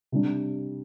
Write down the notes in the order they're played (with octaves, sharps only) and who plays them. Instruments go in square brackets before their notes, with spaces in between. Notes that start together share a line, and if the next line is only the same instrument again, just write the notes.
[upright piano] C3 G3 D4